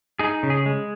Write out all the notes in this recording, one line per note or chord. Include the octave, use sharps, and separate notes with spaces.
D#4 G#4
C#3
G#4
G#3